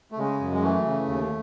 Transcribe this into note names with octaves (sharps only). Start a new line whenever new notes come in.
A3
C#3 G#3
F#2
G#3
E3 A3
C#3
D#2